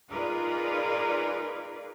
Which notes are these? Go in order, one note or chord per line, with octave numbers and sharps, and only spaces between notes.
D#4 F4 G#4 A#4 B4 D5